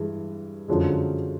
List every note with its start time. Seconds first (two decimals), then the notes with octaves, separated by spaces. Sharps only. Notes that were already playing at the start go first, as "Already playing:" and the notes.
Already playing: G2 E3 G#3
0.68 F#2 D3 F3 G#3